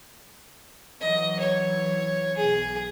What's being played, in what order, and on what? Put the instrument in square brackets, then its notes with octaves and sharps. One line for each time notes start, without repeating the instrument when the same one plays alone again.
[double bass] E3 F#3 [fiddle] D#5
[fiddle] C#5
[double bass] B1 [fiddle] G#4